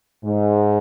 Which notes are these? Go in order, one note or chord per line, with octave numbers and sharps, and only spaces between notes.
G#2